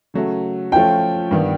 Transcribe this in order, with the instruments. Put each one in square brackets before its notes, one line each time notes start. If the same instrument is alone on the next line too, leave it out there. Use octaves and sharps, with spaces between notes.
[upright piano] C#3 F#3 A3
[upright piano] F3 A3 C#4 F4 [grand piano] G5
[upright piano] G2 D#3 G3 B3